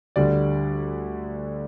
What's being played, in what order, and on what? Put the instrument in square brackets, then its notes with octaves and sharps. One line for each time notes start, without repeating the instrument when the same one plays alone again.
[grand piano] D2 D3 G3 D5